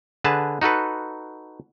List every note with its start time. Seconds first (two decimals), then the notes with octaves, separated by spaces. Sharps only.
0.24 D3 G#4 B4 A5
0.62 D#4 F#4 A4 B4